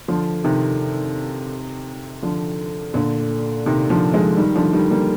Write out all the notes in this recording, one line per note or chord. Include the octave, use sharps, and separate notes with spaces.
D3 F3
C3 D#3
D3 F3
A#2 D3
C3 D#3
D3 F3
F3 G#3
D#3 G3
D3 F3
D#3 G3
G3 A#3